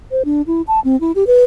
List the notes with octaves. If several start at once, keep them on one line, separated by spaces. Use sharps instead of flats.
C5
D4
E4
A5
C4
E4
G4
B4